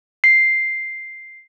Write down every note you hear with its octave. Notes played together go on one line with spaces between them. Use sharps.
C7